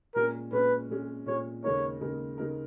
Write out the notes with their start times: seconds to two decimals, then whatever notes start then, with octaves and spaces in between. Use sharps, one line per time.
0.15 A#2 G#3 C#4 A#4
0.52 A#2 G#3 C#4 B4
0.89 A#2 G#3 C#4
1.26 A#2 G#3 C#4 C#5
1.64 D#2 C#3 G#3 D#4 A#4 C#5
2.01 D#2 C#3 G#3 D#4 A#4
2.38 C#3 G#3 D#4 A#4